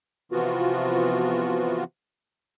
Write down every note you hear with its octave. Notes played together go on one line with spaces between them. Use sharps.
C3 E3 F3 B3 F4 F#4